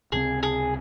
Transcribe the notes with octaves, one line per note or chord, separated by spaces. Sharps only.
C#2 C3 F3 C4 G#4
G#4